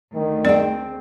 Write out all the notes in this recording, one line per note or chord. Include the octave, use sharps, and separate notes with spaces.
D2 D#3
C4 G#4 D5 G5